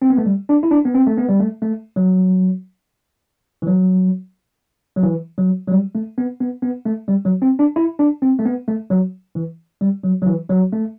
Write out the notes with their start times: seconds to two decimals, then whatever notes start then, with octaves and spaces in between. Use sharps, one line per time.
0.02 C4
0.10 B3
0.18 A3
0.26 G3
0.49 D4
0.63 E4
0.71 D4
0.85 B3
0.94 C4
1.07 A3
1.17 B3
1.29 G3
1.40 A3
1.62 A3
1.96 F#3
3.62 E3
3.67 F#3
4.96 F#3
5.03 E3
5.38 F#3
5.68 F#3
5.72 G3
5.95 A3
6.18 B3
6.40 B3
6.62 B3
6.86 A3
7.08 G3
7.25 F#3
7.42 C4
7.59 D4
7.76 E4
7.99 D4
8.22 C4
8.39 A3
8.45 B3
8.68 A3
8.90 F#3
9.35 E3
9.81 G3
10.04 F#3
10.22 F#3
10.26 E3
10.50 F#3
10.73 A3